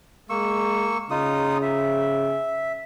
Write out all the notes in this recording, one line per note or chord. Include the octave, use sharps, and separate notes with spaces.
G#3 A#3 C#6 E6
C#3 D#4 F4 D#6
E5